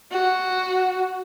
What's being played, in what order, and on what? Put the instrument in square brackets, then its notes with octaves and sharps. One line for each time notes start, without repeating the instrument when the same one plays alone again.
[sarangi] F#4